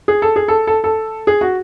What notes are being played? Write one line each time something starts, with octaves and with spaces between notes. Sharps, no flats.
G#4
A4
G#4
A4
A4
A4
G#4
F#4